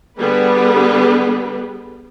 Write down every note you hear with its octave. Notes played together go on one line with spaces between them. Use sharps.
D3 G3 B3 G#4 B4